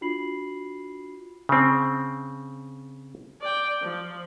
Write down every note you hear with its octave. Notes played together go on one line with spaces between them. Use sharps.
D4 F4 F#4 B5 C7 F#7
C#3 C4
D5 G5
F3